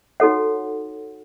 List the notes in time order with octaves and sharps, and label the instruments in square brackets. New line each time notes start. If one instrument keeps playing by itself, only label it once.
[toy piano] D#4 F#4 A4 C#5 F#5